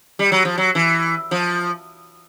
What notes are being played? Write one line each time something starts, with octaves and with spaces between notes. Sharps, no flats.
G3
F#3
F3
F#3
E3
F3